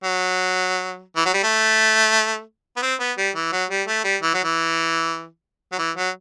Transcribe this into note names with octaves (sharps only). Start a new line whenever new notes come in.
F#3
E3
F#3
G3
A3
B3
C4
B3
G3
E3
F#3
G3
A3
G3
E3
F#3
E3
F#3
E3
F#3